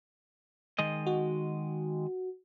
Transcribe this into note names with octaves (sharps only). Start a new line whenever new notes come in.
D#3 G#3 D#5
F#4